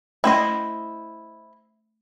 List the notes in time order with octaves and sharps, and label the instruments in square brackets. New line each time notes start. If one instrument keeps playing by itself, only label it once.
[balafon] A3 C#4 [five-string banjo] E4 C5 D#5